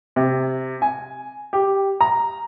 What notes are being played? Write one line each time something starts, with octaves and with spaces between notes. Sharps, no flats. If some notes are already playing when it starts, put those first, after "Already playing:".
C3
G#5
G4
A#5